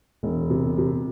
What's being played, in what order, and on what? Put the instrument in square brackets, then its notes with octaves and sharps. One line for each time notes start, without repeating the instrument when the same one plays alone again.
[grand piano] E1
C3
C3